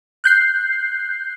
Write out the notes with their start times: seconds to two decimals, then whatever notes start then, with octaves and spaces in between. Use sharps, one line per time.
0.24 F#6 G6 C7